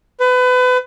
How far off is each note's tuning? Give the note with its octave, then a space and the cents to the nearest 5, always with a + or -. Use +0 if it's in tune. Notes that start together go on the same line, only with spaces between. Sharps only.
B4 +30